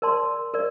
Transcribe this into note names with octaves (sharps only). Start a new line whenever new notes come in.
A#4 D5 A5 C6
A#4 D5